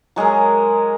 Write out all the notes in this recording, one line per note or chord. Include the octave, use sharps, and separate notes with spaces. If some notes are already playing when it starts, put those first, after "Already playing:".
F#3 G#3 G#4 A#4